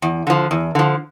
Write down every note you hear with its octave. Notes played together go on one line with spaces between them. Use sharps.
E2
D3 F3
E2
D3 F3